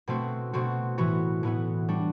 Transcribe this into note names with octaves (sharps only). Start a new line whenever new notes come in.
B2 A3 C4 F#4
B2 A3 C4 F#4
A2 E3 B3 F#4
A2 E3 B3 F#4
G3 D4 F#4